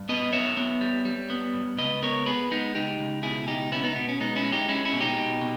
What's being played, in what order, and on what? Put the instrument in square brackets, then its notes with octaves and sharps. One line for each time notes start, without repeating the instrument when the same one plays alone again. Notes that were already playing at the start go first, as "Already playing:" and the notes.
Already playing: [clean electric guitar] G2
B3 B4 D#5
B3 C#5 E5
B3
G3
G3
B3
G2
C#2 B4 D#5
B3 A#4 C#5
B3 G#4 B4
G#3 B3 D#4
C#2 D#4 G4
C#2
B2 E4 G#4
C#2 D#4 G4
B3 C#4 E4
B3 D#4
B2 B3
C#4
G#3 B3 D#4
C#4 E4
G#3
D#4 G4
G#3 C#4 E4
C#4 E4
B2
D#4 G4
B2
B2